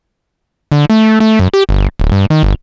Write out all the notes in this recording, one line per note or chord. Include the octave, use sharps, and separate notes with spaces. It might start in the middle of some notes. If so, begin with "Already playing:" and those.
D3
A3
A3
F#2
G4
G1
D1
G2
D#3
G1